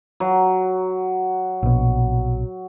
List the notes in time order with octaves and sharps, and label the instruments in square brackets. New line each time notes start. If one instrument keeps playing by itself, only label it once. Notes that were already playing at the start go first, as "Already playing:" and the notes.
[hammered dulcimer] F#3
[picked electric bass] A#1 B2